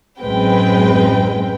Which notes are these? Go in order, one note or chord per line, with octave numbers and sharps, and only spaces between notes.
A1 F#2 G#3 C4 B4 G5